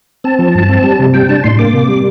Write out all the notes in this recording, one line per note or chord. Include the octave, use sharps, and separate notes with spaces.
C4 A5
F3
G2
C4
G3
C3
G3 G5
D4 A5
A2 C6
A#3 D6
C3
G3